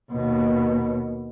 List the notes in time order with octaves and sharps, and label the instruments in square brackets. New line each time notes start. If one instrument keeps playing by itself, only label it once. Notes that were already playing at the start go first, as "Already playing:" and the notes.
[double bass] D#2 B2